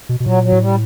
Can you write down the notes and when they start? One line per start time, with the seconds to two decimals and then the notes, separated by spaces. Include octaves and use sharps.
0.09 B2
0.20 B2
0.26 A#2 F#3
0.43 F#3
0.52 A2
0.60 G3